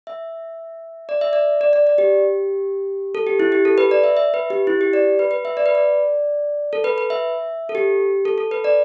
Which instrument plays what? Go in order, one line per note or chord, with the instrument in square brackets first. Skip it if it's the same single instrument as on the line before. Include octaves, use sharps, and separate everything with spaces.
[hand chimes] E5
D5
E5
D5
D5
D5
D5
G4
A4
G4
E4
G4
A4
B4
D5
E5
E5
B4
G4
E4
G4
D5
B4
B4
E5
D5
B4
D5
A4
B4
B4
E5
A4
G4
A4
A4
B4
D5